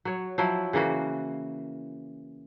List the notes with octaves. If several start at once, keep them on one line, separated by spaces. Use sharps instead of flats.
F#3 C#5
F3 F#3 E4
C#3 E3 A#3 F#4